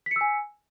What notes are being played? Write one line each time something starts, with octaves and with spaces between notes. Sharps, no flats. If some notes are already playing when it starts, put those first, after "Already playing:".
G#5 E6 B6 C#7